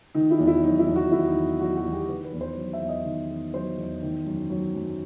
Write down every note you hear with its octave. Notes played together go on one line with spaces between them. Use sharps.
D#3 D#4
E4
E2
E4
F#3 D#4
E4
E2
F#4
D#3 E4
D#4
E2
F#3 F#4
F#4
E2
G4
D#3 B4
B4
E2
C5
F#3
E5
E2
D#5
D#3
E2
F#3 C5
E2
D#3
F#2
F#3
F#2